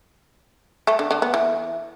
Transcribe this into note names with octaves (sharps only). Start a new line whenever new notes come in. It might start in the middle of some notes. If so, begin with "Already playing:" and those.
A3
D3
D3
B3
E3